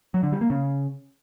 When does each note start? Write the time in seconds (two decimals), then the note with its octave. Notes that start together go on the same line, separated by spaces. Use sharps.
0.14 F#3
0.23 D3
0.32 G3
0.41 A#3
0.50 C#3